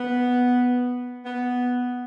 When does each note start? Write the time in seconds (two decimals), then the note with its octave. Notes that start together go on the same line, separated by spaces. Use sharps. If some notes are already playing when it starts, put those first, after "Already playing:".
Already playing: B3
1.25 B3